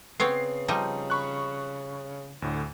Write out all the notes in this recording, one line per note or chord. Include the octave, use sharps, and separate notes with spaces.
C#3 B3 C4 C#5 C7
F3 G3 D#4
B5 C#6 F#6
D2 A2 D3